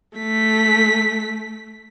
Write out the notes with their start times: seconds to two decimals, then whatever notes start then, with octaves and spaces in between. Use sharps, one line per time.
0.18 A3 B6